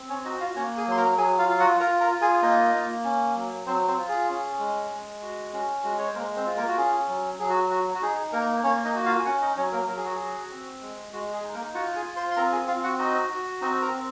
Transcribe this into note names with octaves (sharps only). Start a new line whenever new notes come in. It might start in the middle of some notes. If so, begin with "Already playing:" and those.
Already playing: C4
C#4 C#5
D#4 F#4 D#5
F4 F5
A#3 C#4 C#5
G#4 G#5
F#3 C6
A#4 A#5
F#3 G#4 G#5
F4 F5
F4 F5
F#4 F#5
F4 A#4 A#5
A#4 A#5
F4
G#4 G#5
A#3 D#4 D#5
A#3
C#4
F#3
F#3 C4 C5
C4 C5
F4
G#4
C#4
G#3
G#3
F#4
C#4 F#4
G#3 F#4
C#5
C5
G#3 A#3 A#4
C4 C5
F4
A#3 A#4
F#4
C#4 G#4
F#3
F#3 G#4
F#4
F#4
F#4
D#4 G#4
A#3 A#4
A#3 C#4 C#5
D#4 D#5
F#4
F4 F5
G#5
C#4 F#4 F#5
D#4 D#5
F#3 C#4 C#5
A#3 A#4
F#3 A#4
G#4
F#4
G#4
F#4
C4
G#3
G#3 F#4
G#4
D#4
A#3 A#4
F4 F#4 F#5
G#4 G#5
F4
C5 C6
C6
C4 A#4 A#5
G#4 G#5
C4 F4 F5
F#4 F#5
D#4 F#4 D#5
F#4
C4 D#4 D#5
A#4 A#5
C4